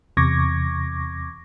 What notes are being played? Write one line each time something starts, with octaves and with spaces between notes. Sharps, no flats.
E2 C3 C#6 D6 G#6 A#6